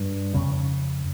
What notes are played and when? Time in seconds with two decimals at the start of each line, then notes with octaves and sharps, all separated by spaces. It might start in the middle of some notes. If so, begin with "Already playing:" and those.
Already playing: G2
0.34 F2 C#3 C#4